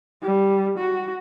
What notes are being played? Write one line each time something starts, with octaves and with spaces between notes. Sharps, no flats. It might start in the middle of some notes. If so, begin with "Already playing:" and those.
G3
F#4